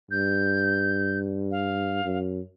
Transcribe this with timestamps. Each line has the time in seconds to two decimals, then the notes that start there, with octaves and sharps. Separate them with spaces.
0.11 G2 G6
1.51 F5
2.05 F#2